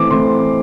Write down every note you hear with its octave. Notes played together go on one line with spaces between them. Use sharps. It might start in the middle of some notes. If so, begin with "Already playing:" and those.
Already playing: E3 A3 C4 D6
E3 A3 C4 C6